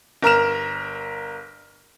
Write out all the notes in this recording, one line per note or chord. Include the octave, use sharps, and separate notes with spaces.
G1 A#4 A#5 F6 E7